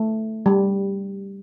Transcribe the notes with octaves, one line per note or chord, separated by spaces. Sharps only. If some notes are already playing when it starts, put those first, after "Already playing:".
Already playing: A3
G3